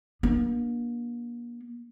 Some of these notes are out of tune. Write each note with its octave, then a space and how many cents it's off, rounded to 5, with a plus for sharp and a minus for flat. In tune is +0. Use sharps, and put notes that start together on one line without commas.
A#3 +35 D4 +0